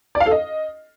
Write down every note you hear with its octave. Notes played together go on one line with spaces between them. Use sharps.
D5
F5
A4
D#5